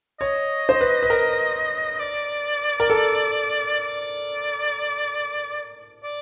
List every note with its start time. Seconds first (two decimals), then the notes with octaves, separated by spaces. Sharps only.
0.20 C#5 D#5
0.69 C5
0.81 B4
1.03 B4
1.10 A#4
1.99 D5
2.80 A#4
2.90 A4
3.80 D5
6.04 D5